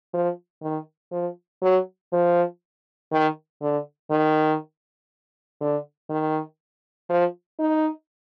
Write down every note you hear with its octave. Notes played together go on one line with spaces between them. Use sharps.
F3
D#3
F3
F#3
F3
D#3
D3
D#3
D3
D#3
F3
D#4